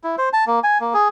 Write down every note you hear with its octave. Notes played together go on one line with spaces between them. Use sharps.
E4
C5
A5
A#3
G#5
A#3
G#4